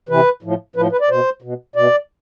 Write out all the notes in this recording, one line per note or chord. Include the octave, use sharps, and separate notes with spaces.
C3 E3 B4
A2 F3
A2 F3 B4
B4
D5
B2 C5
B2
B2 D5